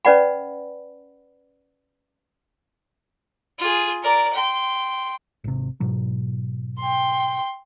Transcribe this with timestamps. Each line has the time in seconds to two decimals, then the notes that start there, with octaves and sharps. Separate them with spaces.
0.05 C#4 B4 D5 F#5 B5
3.59 F4 G#4
4.03 A#4 D5
4.33 G5 C6
5.44 G#1 C3
5.80 G#2 B2 F#3
6.80 G5 C6